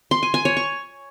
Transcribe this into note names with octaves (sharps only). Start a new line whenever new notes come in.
C6
G#5
G#5
C#5
C#6